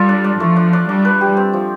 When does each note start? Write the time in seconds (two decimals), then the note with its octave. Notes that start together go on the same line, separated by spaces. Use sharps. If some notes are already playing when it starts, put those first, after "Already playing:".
Already playing: G3 F4 A4
0.09 D4
0.24 D4
0.40 F3 A3
0.56 D4
0.73 D4
0.88 G3 D4
1.05 B4
1.21 G4
1.37 C4
1.53 F3